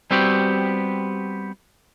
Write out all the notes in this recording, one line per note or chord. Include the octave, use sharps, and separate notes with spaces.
G3 B3 C4 F#4 G4